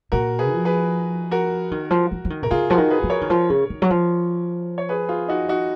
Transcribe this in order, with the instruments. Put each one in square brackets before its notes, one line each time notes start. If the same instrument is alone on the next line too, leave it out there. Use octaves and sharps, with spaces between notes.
[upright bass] A#2 [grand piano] F#4 A#4
[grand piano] G#4 B4
[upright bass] F3
[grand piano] G#4 B4
F#4 A#4
[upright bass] D#3
F3
F3
F3
D#3
[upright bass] B2 [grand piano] A#4
[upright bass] C#3 [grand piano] F4 G#4
[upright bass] F3 [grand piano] F#4 A#4
[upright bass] D#3
[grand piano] G#4 B4
[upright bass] F3
[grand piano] A#4 C#5
[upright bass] D#3
F3
C#3
D#3
F#3
F3
[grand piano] C#5
G#4 B4
F4 G#4
D#4 F#4
D#4 F#4